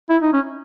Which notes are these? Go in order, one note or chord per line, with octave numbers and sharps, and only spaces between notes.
E4
D#4
C#4